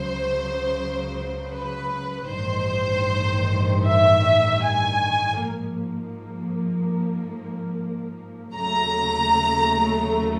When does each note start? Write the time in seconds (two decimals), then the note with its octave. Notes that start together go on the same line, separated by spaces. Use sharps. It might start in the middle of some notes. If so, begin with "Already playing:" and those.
Already playing: C#2 C#3 F#3 C5
1.50 B4
2.28 A1 G2 D#3 C5
3.85 E5
4.63 G#5
5.42 G#2 F3 A#3
8.55 D#2 C#3 F#3 A3 A#5